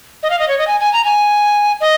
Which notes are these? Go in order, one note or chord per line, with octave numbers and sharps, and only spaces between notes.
D#5
F5
D#5
C#5
D#5
G#5
G#5
A#5
G#5
D#5